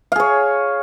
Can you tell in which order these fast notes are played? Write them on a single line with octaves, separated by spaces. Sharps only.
F5 G#4 C#5